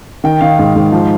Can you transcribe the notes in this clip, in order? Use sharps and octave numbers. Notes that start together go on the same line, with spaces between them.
D#3 G5
D#3 F5
G#2
G#2
F3